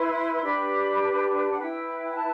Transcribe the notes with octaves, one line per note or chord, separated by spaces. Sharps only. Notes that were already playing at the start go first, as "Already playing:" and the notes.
Already playing: E4 B4 C6
D4 G4 B4 B5
A5
B5
A5
F#5
E4 B4 G5
G5
A5